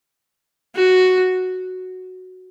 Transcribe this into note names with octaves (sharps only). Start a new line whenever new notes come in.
F#4